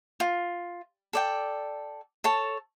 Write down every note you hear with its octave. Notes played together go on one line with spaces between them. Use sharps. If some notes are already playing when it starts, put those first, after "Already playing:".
F4
A4 D5 G5
A4 C#5 A5